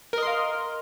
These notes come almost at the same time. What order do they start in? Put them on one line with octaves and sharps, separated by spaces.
A#4 D#5 C6 F5